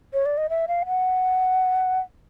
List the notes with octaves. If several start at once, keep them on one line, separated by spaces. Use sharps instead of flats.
C#5
D5
D#5
E5
F5
F#5